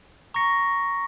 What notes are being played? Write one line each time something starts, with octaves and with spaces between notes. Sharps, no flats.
A#5 C#6 A#6 C#7